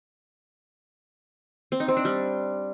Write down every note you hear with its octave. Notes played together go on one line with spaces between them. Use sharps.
C4
D#4
C4
D4
G3